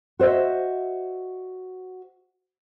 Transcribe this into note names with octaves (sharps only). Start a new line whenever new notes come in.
F#4 C5 D#5 E5